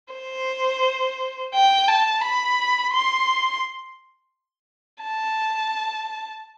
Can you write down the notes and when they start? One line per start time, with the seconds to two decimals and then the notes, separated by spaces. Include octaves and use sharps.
0.14 C5
1.54 G5
1.89 A5
2.24 B5
2.94 C6
5.03 A5